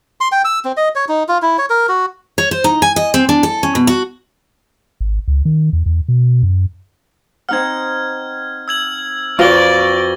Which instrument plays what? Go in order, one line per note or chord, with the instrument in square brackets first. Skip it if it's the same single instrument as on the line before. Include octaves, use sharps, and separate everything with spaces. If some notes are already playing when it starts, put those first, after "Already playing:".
[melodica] C6
G5
E6
C4
D#5
C#5
D#4
F4
E4
C#5
A#4
F#4
[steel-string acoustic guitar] C#5
C5
D#4
G#5
D#5
C4
D4
A4
C#4
B2
F#4
[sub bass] G#1
C#2
D#3
E2
E2
B2
F#2
[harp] C4 D#4 F#5 [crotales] F6 G#6
[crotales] E6 G#6 F#7
[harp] F2 F#4 B4 [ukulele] F4 [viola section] D5 [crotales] C#6 A#6 G7